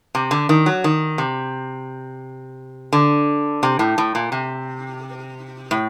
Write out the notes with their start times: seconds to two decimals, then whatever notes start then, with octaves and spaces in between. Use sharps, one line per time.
0.15 C3
0.31 D3
0.49 D#3
0.66 F#3
0.84 D#3
1.18 C3
2.93 D3
3.63 C3
3.79 A2
3.98 A2
4.15 A#2
4.32 C3
5.71 A2